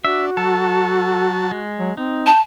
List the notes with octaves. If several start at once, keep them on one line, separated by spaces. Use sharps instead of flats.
D4 F#4 E5
F#3 A4 A5
G#3
F#3
C4 D#4
G5 A5